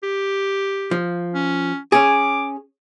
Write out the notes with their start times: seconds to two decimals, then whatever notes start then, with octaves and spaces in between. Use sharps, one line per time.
0.03 G4
0.91 F3
1.34 C#4
1.92 C#4 G#4 D6